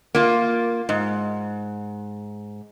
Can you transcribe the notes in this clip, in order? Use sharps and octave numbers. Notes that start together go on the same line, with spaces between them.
A#3 F4
G#2